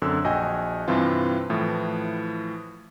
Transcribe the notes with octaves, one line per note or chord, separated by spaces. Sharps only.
F#2 D3 C4 E6
A#1 F#4 D#5 G5 G#5
G2 C3 E3 C4 F4
A2 E3 F3